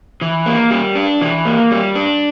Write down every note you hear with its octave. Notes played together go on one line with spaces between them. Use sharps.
E3
A#3
G3
D4
E3
A#3
G3
D4